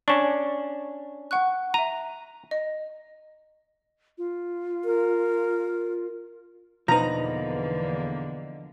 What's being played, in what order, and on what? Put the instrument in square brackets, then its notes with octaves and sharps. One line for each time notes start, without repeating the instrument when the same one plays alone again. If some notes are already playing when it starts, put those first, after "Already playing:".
[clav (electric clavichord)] C#4 D4 [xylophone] C#6 E7
[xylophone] F#5 C#6 F#6
[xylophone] E5 D#7 [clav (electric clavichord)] A#5
[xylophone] D#5
[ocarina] F4
[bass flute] A#4
[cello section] E2 D3 A#3 [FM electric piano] B2 B4 [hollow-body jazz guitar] F3 D#4 [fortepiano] A#5